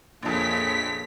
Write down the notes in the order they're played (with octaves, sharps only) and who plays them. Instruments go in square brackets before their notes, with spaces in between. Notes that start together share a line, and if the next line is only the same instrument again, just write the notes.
[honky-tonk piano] A#1 F2 [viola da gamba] A#2 G#4 C#5 [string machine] B6